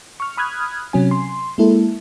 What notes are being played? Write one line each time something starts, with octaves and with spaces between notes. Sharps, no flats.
C#6 F6
B5 D#6 F6 F#6 G#6
C3 F#3 C#4 G#5
C6
G#3 A#3 E4 A4